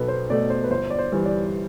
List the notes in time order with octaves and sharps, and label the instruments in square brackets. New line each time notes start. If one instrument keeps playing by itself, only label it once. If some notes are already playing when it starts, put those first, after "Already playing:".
Already playing: [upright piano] B1 B2 A4 B4
C5
B2 A3 D5
C5
B4
G1 C5
D5
C5
G2 E3 G3
D5